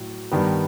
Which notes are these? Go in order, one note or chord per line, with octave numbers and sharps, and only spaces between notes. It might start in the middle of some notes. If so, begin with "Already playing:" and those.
Already playing: A2 F#3 A3
G2 D#3 G3 B3